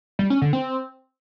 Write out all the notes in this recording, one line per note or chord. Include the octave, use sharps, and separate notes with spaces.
G3
C#4
D3
C4